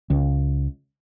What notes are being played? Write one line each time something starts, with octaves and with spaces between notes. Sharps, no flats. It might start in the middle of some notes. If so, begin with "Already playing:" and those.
C#2